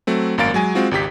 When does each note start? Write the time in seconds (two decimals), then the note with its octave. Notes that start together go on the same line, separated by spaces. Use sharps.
0.07 F#3 A3 C4
0.38 G#1 F#2 A#3 F5 A6 D7
0.54 F#3 G#3 G#5
0.75 G#3 C4 F4 F#4
0.91 G#1 C#2 G4 B6